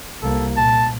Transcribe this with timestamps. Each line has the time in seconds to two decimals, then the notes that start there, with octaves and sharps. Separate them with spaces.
0.22 C2 A#3 A4
0.57 A#2 A5